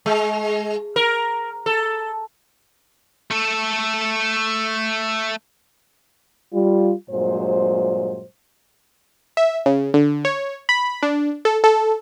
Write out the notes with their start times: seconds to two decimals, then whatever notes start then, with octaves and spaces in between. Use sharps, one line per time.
0.06 G#3
0.96 A#4
1.66 A4
3.31 A3 A4
6.53 G3 F4
7.10 G2 A#2 F#3 G#3 C5
9.37 E5
9.66 C#3
9.94 D3
10.25 C#5
10.69 B5
11.03 D4
11.45 A4
11.64 A4